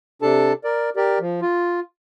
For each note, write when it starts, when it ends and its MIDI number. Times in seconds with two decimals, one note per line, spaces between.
0.22 0.53 48
0.22 0.53 62
0.22 0.53 69
0.22 0.53 81
0.64 0.90 70
0.64 0.90 74
0.96 1.19 67
0.96 1.19 70
0.96 1.19 74
1.20 1.40 53
1.42 1.80 65